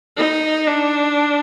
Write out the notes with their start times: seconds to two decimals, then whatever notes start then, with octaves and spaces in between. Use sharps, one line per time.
0.17 D#4
0.67 D4